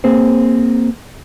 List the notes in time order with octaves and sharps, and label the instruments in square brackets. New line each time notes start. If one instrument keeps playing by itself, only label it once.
[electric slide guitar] A#3 C4 G#4 C5